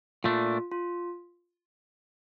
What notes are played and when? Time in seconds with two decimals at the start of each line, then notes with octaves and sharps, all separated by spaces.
0.24 A#2 A3 D4 F4
0.71 F4